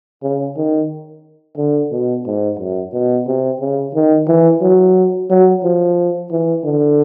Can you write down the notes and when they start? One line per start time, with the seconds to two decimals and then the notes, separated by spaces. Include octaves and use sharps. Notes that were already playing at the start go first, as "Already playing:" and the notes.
0.23 C#3
0.57 D#3
1.57 D3
1.91 B2
2.26 G#2
2.59 F#2
2.93 B2
3.27 C3
3.61 C#3
3.95 D#3
4.28 E3
4.62 F#3
5.30 F#3
5.64 F3
6.31 E3
6.65 D3